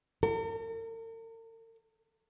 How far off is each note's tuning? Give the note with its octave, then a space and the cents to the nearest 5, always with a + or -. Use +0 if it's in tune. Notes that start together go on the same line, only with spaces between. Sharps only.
A#4 -45